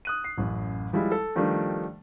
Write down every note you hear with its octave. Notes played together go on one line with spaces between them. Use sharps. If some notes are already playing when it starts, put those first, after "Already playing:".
D#6 F#6 D#7
C7
A1 F#2
F3 G3 G#3 E4
A4
D#3 F3 G3 A3 D4